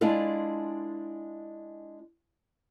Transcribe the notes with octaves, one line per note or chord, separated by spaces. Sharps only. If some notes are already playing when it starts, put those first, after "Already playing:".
G#3 D4 E4 F4 A4